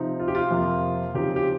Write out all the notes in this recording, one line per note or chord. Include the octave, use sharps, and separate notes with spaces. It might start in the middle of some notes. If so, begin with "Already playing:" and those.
Already playing: C3 F3 C4 D#4
F4
G4
F4
F2 C3 F3 A#3
C#3 F3 C4 D#4 G4
G4